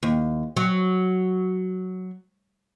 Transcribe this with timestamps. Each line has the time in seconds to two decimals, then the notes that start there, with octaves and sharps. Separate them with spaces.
0.03 D#2
0.56 F#3